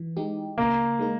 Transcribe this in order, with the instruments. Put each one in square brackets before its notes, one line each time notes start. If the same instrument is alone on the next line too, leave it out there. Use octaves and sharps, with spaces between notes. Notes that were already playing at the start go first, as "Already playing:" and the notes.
Already playing: [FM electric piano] E3
G#3 D#4 G4
[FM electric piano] C#3 [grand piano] A#3
[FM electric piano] G#3 D#4 A#4